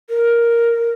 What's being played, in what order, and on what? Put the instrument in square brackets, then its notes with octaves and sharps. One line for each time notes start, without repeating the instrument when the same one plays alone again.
[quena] A#4